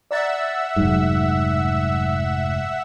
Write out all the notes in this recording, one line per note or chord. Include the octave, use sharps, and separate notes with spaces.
D5 E5 F#5 A#5 E6 A6
F1 G#2 F#3